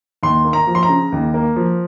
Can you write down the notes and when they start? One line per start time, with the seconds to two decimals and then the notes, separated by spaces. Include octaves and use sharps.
0.23 D#2 C6
0.45 A#3
0.53 A#5
0.67 F3
0.75 C6
0.83 A#5
0.89 C#3
1.12 D#2
1.34 A#3
1.56 F3